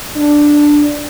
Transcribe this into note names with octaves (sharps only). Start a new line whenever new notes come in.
D4